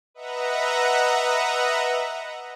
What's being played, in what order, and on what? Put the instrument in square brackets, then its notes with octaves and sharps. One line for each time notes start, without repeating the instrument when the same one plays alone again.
[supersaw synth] B4 D#5 E5 F#5 A#5